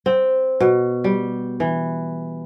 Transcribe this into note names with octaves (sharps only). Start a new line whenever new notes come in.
C4
B2
G3
E3